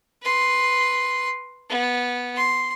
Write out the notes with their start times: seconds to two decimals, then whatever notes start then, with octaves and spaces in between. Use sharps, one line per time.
0.22 B4 C6
1.70 B3
2.36 C6